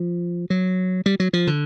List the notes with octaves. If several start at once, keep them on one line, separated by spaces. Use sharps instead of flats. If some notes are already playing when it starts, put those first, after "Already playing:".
Already playing: F3
F#3
G3
F#3
F3
D3